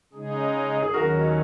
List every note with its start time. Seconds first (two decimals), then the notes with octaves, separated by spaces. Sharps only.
0.13 C#3 G#3 D#4 G#4
0.82 G#4
0.94 D#2 D#3 F#3 C#4 F#4 A#4